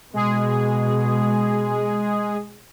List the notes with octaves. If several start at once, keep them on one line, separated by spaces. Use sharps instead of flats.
B2 G#3 G#4